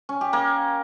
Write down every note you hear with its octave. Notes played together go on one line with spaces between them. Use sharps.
C#4
G4
A#3